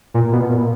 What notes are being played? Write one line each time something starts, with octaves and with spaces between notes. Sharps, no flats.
A#2
B2
A#2